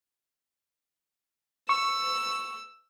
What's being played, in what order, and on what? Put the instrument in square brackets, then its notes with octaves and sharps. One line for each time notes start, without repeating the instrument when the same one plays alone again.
[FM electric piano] C#6 [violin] E6